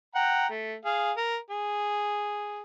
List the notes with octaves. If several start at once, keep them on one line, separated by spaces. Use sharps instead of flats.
F#5 G5 A#5
A3
G#4 F5
A#4
G#4